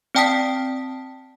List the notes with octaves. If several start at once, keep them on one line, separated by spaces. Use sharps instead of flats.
C4 D5 G5 A5 D#6 B6